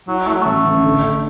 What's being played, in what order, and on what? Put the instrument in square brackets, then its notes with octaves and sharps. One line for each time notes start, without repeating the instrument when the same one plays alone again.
[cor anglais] F#3 [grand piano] E4
[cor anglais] A3 [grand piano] E4
[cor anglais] F#3
[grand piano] A1 [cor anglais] A3
[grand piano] A1
D3
D3